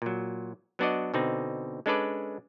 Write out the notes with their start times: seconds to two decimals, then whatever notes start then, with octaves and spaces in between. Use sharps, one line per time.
0.02 A#2 F#3
0.79 F#3 B3 D4 F#4 D5 D#5
1.14 B2 D3 C4 D#4
1.86 G#3 C#4 D4 A4 B4 D5